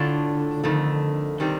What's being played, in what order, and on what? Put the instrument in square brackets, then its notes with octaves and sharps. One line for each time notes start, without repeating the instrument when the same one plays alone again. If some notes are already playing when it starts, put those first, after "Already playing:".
Already playing: [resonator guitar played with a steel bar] A2 A3 D4 F4 [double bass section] D3
[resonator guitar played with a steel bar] F2 D#3 A3 [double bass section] D3
[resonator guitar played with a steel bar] C3 D#3 G3 C4